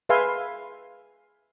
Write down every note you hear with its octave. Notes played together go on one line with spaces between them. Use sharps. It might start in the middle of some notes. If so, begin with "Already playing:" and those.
G#4 B4 E5 F5 G#5 C6